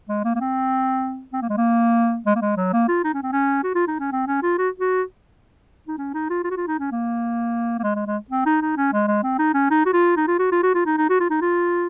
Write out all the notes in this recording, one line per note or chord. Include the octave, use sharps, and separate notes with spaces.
G#3
A#3
A#3
C4
C4
A#3
G#3
A#3
G#3
A#3
G#3
F#3
A#3
F4
D#4
C#4
C4
C#4
F#4
F4
D#4
C#4
C4
C#4
F4
F#4
F#4
D#4
C#4
D#4
F4
F4
F#4
F4
D#4
C#4
A#3
A#3
G#3
G#3
G#3
C4
D#4
D#4
C#4
G#3
G#3
C4
D#4
C#4
D#4
F#4
F4
D#4
F4
F#4
F4
F#4
F4
D#4
D#4
F#4
F4
D#4
F4